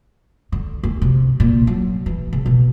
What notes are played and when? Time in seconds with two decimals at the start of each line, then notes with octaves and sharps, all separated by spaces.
0.52 D3
0.84 D2
1.02 C3
1.40 A#2
1.67 F#3
2.06 E3
2.33 C#3
2.46 B2